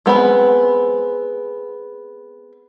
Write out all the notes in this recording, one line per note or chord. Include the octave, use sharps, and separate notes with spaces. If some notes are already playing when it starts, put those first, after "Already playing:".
G#3 B3 C4 B5